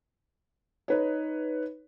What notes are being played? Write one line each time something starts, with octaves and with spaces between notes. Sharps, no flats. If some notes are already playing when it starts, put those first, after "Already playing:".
D#4 B4 C#5